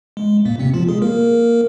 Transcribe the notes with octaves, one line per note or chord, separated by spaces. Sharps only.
G#3
A#2 A#3
C3 C4
F3 F4
G#3 G#4
A#3 A#4